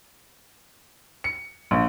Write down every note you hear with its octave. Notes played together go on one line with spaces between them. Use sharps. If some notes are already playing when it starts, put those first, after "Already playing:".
C#7
A#1